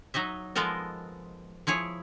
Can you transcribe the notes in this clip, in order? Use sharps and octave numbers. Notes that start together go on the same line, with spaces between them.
F#3 D#4 D#5 E5
F3 G#3 B3 A4 A#4 D#5
F3 E4 G#4 C#5